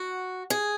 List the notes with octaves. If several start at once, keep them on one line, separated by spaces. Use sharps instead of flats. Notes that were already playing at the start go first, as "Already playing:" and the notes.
Already playing: F#4
G#4